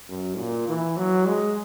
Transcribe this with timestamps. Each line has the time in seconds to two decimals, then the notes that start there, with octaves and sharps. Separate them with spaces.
0.09 F#2
0.38 A#2
0.68 E3
0.97 F#3
1.27 G#3